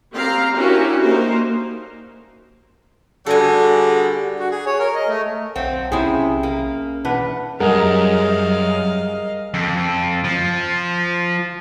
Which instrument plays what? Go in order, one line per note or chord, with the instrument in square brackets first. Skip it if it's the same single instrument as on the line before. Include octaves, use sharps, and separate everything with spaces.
[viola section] C4 G4 F5 A#5
C#4 D4 E4 F#4 G4 A#4
A#3 D#4 A#4 C5
[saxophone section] D3 G3 [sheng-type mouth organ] F#4 G#4 [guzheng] A4 G#5
[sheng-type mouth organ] F#4
G#4
C#5
A#4
D#5
A3
[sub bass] B1 [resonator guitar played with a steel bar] C4 [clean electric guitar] C#5 F5 F#5
[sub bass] B1 [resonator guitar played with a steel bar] C3 E4 [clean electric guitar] C#4 [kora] G#4
[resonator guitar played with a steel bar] A#3
[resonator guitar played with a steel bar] E2 [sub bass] B2 [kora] D4 B4 F#5
[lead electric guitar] F#2 [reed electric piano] G3 G#4 [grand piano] A#4 F#5 G#5 [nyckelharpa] D#5 F5
[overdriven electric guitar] F2
F3